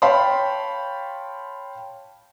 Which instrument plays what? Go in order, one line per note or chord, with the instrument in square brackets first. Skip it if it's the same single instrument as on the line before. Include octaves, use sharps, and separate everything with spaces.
[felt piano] C#5 F5 G5 A5 B5 C6